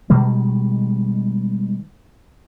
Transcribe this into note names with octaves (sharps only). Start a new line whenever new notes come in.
B2 D#3 G3 G#3